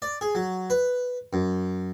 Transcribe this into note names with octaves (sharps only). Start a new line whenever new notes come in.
D5
G#4
F#3
B4
F#2